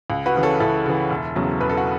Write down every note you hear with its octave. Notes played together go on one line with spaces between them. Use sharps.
C#2
F#4 B4
C#3 E3
A4 C#5
C#2 E4 A4
C#3 E3
E1
E2 C#3 F#3
E1 B4
A4
F#4